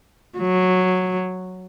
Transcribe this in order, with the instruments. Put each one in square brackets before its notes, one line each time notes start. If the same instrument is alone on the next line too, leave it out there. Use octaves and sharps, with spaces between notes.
[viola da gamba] F#3